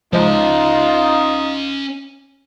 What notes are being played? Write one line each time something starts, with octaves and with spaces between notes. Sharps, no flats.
F3 G#3 C#4 D#4 F4 D#5